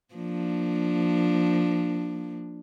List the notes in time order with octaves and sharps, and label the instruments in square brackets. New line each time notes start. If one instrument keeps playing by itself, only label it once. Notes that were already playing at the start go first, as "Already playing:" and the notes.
[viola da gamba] F3 A#3 D4